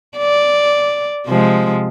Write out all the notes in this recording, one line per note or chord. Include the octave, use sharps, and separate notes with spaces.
D5
C3 F3 G#3